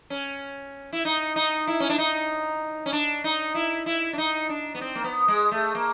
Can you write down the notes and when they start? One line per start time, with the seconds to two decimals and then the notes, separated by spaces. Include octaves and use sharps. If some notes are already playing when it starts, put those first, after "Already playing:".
0.10 C#4
0.93 E4
1.05 D#4
1.36 D#4
1.67 E4
1.80 C#4
1.90 D4
1.98 D#4
2.86 C#4
2.93 D4
3.24 D#4
3.55 E4
3.86 E4
4.13 D4
4.18 D#4
4.49 D4
4.75 B3
4.81 C4
4.95 A#3
5.04 B3
5.28 G#3
5.51 A3
5.75 A#3